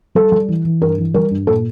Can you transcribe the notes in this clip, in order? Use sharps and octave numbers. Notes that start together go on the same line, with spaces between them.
G3 A4
G3
E3
E3
G2 A#4
E3
G3 A#4
G2
A#2 A4